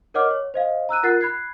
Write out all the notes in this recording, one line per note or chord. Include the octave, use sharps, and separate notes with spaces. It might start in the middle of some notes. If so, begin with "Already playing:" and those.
A#4 C#5 D#5 F#5 D6 F6
C#5
C5 D#5 F5
A#5 E6 F#6 D#7
F4 A#4 F#5 F#6 A6 C7
B5 F#6 G#6 C7